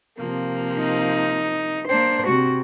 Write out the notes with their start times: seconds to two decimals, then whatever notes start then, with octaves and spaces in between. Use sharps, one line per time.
0.16 C3 F3 A#3
0.78 D#4
1.88 A#3 D4 C5
2.27 C3 F#4